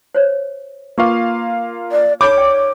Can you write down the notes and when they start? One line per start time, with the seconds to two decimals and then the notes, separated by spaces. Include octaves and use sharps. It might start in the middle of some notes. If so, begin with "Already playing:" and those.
0.15 C5 C#5
0.98 A#3 F4 B4 F5 C#6 D6
1.92 D5
2.21 D#4 A4 C#5 B5 D6 G6 D7
2.37 D5 G5